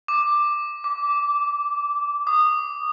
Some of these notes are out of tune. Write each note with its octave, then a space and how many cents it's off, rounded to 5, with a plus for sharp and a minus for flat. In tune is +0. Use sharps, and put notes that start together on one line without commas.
D6 +10
D6 -15
D#6 -20